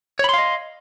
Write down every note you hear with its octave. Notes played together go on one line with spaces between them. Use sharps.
C#5 D#5 F5 B5 C6